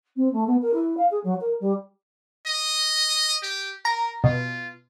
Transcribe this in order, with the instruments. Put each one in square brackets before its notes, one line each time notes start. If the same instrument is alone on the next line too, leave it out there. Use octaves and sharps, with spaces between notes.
[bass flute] C4
A3
B3
A#4
E4
F5
G#4
F#3
A#4
G3
[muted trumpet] D#5
G4
[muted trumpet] A#4 [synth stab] A#5
[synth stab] B2 [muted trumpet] F4